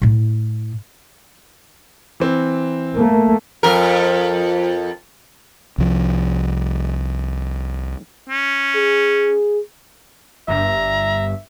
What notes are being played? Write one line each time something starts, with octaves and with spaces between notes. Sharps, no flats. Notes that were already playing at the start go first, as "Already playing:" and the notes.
A2 E4
E3 C4
A3 A#3
F2 A#4
C2 F3
C#4
G#4
G1 G2 E5 A#5